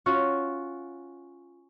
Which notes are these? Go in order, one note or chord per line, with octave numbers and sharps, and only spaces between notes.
C#4 F4 F#4